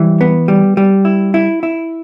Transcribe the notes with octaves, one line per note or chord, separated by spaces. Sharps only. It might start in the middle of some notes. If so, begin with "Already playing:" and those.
Already playing: E3 G3
B3
G3
G3
E4
E4
E4